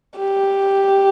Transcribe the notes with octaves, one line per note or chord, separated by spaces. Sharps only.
G4